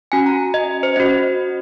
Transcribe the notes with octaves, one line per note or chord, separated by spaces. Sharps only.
C#4 F#4 G#5
A#5
D#5
C5
C#4 F#4 D#5